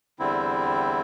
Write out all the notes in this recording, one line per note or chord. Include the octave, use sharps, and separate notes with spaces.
E2 D3 G3 C4 E4